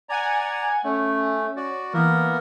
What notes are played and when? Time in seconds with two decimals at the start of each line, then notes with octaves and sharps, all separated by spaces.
0.09 D5 F#5 G#5 A#5 G#6
0.84 A3 C#4
1.57 F#4 D5
1.94 E3 A#3 B3 A#4